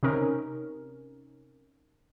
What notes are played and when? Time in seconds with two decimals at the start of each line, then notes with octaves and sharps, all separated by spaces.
0.03 C3 C#4 D#4 A#4